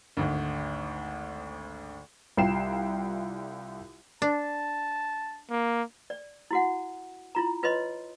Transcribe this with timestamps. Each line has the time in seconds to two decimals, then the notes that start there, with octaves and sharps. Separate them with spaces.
0.17 G#1 D2
2.37 C2 G3 F4 G5 C7 E7
4.22 D4 A5
5.50 A#3
6.10 D5
6.51 E4 F#4 F#5
7.35 E4 F4 A#5
7.63 F4 B4 C#5 D#5 C6